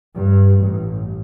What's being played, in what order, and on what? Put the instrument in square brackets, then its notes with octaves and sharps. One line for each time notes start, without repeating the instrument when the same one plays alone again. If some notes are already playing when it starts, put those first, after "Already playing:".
[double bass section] G2
A1